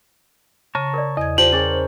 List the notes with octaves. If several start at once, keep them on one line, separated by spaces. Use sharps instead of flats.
C#3 A5 A#5 C#6
A#4 D5
E2 D#5 G#6
F4 G4 C5 D5 A5 F#7
C#4 G#4 A#4 C5 C#5 G#5 A6